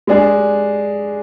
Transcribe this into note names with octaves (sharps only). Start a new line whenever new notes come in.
G#3 D4 G#4